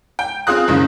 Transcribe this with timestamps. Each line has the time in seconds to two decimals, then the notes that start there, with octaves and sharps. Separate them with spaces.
0.19 G5
0.47 C4 F4 G#4 F5 D#6 F#6
0.68 F#1 C#3